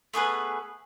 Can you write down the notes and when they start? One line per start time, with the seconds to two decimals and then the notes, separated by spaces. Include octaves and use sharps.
0.14 A3 B3 G#4 B4